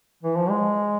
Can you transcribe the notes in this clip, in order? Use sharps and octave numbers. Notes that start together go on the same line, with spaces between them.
E3
F3
G#3